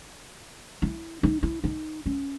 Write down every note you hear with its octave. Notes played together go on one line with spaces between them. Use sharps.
E4
D#4
E4
D#4
C#4